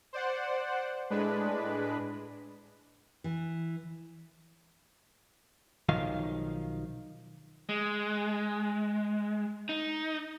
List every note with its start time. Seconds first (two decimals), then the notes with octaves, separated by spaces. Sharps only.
0.13 C5 D5 F#5
1.10 A2 G#3 D4 B4
3.24 E3
5.89 B1 D#3 F3 F5
7.69 G#3
9.69 D#4